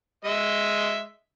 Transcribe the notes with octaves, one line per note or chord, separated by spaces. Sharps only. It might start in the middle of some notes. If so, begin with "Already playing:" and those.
G#3 D#5 E5